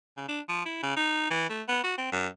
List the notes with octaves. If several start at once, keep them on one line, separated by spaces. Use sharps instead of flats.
C#3
D4
F3
E4
C#3
D#4
E3
A3
B3
F#4
C4
F#2